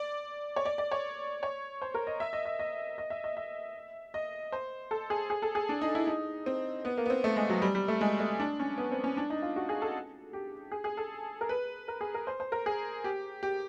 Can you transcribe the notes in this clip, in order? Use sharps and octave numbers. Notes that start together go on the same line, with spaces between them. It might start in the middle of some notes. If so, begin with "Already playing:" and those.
Already playing: D5
C#5
D5
D5
C#5
C#5
C5
A#4
D#5
E5
D#5
D#5
D#5
D#5
E5
D#5
E5
D#5
C5
A4
G#4
G#4
A4
G#4
D4
D#4
E4
D#4
C4
B3
A#3
B3
C4
A3
G#3
F#3
G3
G3
A3
G#3
A3
D4
C#4
B3
C4
C#4
D4
D#4
F4
F#4
G#4
A4
G4
G#4
G#4
A4
A#4
B4
A#4
G#4
A#4
C5
C5
A#4
G#4
G4
G4